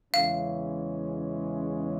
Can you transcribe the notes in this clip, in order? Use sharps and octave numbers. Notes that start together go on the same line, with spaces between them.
E2 C#3 E3 G#3 C#4 F5